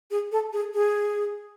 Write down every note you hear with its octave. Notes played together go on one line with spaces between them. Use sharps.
G#4
A4
G#4
G#4